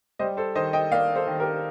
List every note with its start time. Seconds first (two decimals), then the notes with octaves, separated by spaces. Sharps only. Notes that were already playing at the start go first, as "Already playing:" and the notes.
0.19 G3 C5 D#5
0.37 A4 C5
0.55 D#3 C5 D#5
0.73 D#5 G5
0.92 A#3 D5 F5
1.16 A4 C5
1.27 D#3
1.40 G4 A#4